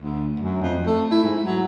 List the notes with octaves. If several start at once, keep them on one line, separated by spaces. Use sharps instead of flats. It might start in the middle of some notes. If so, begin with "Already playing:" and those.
D2
F#2
F2
A3
E4
G#2
F#3